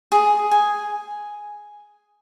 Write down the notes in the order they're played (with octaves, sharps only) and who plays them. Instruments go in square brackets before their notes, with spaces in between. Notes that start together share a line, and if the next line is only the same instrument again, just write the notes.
[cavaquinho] G#4
G#5